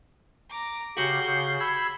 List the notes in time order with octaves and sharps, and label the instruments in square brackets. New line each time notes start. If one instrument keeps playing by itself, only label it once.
[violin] A#5 D6
[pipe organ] C#3 G4 [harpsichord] F#4 [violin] G6 C7
[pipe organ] C#3
B5 E6 G#6